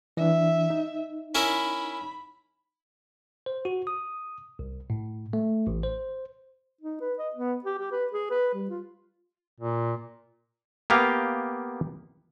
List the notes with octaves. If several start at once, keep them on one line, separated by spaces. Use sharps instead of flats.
E3 D4 E5
D#4
C#4 E4 A#4 B5
C5
F#4
D#6
C2
A2
A3
A1
C5
D#4
B4
D#5
B3
G4
G4
B4
G#4
B4
G3
F4
A#2
A#3 B3 G4 F5